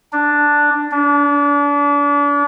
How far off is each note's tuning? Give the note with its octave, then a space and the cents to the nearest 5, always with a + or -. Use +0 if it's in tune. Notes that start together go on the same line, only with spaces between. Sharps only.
D4 +0
D4 -35